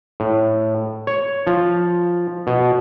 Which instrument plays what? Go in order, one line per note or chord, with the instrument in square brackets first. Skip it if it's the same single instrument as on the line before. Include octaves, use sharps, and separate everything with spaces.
[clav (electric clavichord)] A2
C#5
F3
B2